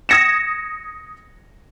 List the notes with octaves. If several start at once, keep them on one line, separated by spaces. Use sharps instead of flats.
D#6 G#6 A#6 C#7 E7